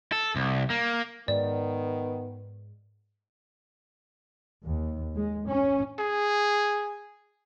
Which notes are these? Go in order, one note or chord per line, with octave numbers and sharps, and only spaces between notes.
A4
C2
A#3
G#2 D#3 B3 D5
D#2
G#3
C#4
G#4